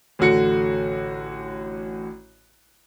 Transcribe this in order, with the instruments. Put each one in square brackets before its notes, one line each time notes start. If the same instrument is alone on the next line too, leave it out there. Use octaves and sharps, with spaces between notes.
[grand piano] A1 D3 F#4 C#7